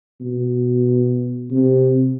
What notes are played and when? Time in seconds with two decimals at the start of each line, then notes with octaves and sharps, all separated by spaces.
0.20 B2
1.51 C3